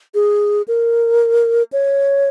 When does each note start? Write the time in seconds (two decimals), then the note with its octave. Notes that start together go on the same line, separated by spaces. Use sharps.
0.15 G#4
0.68 A#4
1.73 C#5